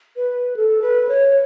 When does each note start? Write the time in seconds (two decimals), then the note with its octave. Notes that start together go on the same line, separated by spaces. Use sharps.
0.16 B4
0.56 A4
0.82 B4
1.09 C#5